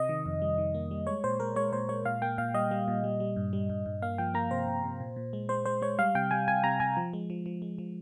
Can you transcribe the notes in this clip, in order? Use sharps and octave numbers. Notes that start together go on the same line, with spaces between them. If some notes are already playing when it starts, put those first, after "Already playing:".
Already playing: C3 D#5
D#3
F2
G3
D#3
A#3
G3
G#3 C#5
A#2 C5
G#3 A#4
G#3 C#5
A#2 C5
G#3 C#5
A#2 F5
A#3 G5
A#2 F5
G3 D#5
G3
A#2
G3
G3
G2
G3
G2
G2
A#3 F5
F3 G5
A#3 A#5
C3 C5
C3
C3
A#2
A#2
G#3
G#3 C5
G#3 C5
G#3 C#5
G3 F5
C3 G5
G3 G#5
C3 G#5
C3 A#5
C3 G#5
F3
G#3
F3
F3
G#3
F3